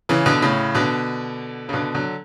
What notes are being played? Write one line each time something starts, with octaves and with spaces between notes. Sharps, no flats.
C#3 E3
B2 D3
A2 C#3
B2 D3
C#3
B2 D3
D3 F#3